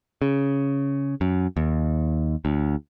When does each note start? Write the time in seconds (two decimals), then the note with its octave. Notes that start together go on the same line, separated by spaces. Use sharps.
0.22 C#3
1.21 F#2
1.57 D#2
2.45 D2